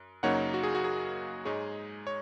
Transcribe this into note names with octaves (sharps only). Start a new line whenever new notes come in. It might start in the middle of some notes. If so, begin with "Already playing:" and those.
Already playing: F#2
F#2 C#3 F#3 A#3 D#4 C#5 F#5
F#4
G#4
F#4
G#4
G#2 G#3 D#4 G#4 C#5
C#5